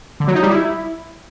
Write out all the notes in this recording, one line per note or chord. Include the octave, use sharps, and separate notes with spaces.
D3
F#3
D#4
G3
E4